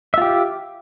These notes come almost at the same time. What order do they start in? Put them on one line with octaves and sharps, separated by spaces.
E5 F4 G4